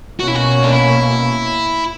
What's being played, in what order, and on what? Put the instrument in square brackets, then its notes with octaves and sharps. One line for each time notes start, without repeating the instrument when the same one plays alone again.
[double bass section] B2 A#3 C#4 [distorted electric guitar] F#4
[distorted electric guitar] E4
F#4
D4
E4